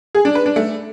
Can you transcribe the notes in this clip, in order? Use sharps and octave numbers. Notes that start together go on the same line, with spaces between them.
G#4
D4
B4
D4
A3